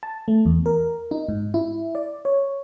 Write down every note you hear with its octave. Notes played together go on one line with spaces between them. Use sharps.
A5
A3
E2
A#4
D#4
G#2
E4
D5
C#5